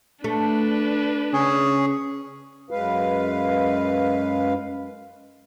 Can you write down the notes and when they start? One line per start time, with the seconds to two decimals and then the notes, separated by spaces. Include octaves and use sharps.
0.24 A3 D4 B4
1.33 C#3 C#4 G#4
2.71 F#2 G#3 B4 F5